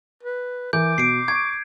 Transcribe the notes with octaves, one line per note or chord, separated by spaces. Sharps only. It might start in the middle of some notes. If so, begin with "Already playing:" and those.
B4
E3 A#4 D6 G6
B2 C7 D7
C#6 G#6